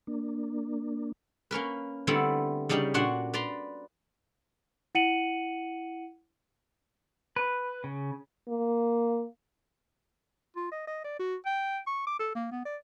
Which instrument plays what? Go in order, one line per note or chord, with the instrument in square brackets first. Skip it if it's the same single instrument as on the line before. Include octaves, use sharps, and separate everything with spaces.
[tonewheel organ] A#3 D4
[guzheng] A#3 C#4 A#4 B4
D3 G3 A3 B3 C4 E4
C#3 G3 D4 D#4 G4
A#2 D4 F#4 F#5 C6
B4 D5 A#5 C6
[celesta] E4 F#5 C#7 D#7 F#7
[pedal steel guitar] B4
C#3
[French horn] A#3
[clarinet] F4
D#5
D#5
D5
F#4
G5
C#6
D6
A4
A#3
B3
D5